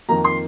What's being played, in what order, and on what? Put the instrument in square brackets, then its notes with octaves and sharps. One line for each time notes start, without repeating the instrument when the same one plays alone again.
[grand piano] F2 D#3 A#3 A#5
C6